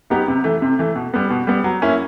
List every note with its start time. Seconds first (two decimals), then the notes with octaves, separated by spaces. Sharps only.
0.10 F#3 B3 D#4 G4
0.28 C3
0.44 E3 A3
0.62 C3
0.79 E3 A3
0.96 B2
1.14 G3 B3
1.30 B2
1.47 G3 B3
1.64 F#3
1.82 A#3 C#4 E4